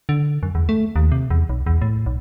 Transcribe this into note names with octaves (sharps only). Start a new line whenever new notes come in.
D3
F#2
E2
A3
D#2
C3
E2
B1
E2
A2
B1